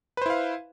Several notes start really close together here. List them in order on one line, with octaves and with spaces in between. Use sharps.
B4 C5 E4 F5